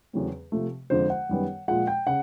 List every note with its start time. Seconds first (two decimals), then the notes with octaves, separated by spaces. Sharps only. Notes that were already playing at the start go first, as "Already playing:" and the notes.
0.13 E2 C#3 F#3 A3 C4
0.52 C3 F3 A3
0.90 F2 D3 F3 G#3 C5
1.10 F#5
1.29 F#2 D#3 G3 B3
1.68 A#2 F3 G#3 F#5
1.87 G5
2.07 C#3 F#5